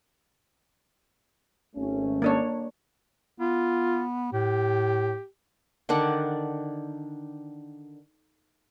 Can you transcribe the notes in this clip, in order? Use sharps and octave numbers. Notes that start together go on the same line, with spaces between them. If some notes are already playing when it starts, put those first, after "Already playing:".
G#1 A3 C#4
A#3 D4 C#5
B3 F4
A2 G4
D3 D#3 D4 F#5